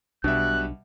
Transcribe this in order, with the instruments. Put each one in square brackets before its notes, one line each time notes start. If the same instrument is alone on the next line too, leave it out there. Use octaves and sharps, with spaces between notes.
[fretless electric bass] B1 D4 [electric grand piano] B2 G3 E5 [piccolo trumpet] F#6